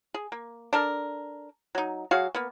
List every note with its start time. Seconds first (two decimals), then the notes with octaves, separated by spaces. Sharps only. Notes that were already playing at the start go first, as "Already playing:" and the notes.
0.14 G#4
0.32 A#3
0.73 D4 A4 A#4
1.75 F#3 D#4
2.11 F#3 F#4 G#4 F5
2.35 A#3 B3